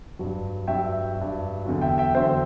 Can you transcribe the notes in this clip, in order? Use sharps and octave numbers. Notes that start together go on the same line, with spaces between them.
G2 F#3
G2 F#3 E5 G5
G2 F#3
E2 D3 F#3
E5 G5
E5 G5
E2 D3 F#3 C5 E5